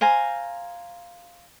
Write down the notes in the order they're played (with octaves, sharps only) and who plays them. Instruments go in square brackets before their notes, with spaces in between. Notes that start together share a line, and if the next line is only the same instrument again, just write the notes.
[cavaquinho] C5 F5 G#5 A#5